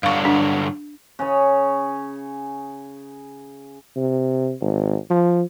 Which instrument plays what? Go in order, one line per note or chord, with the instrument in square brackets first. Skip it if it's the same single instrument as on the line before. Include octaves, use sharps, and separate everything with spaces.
[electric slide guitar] G2 D3 F#3 [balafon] F5 C#6
[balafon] D4
[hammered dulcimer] C#3 G#4 C#5
[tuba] C3
G#1
F3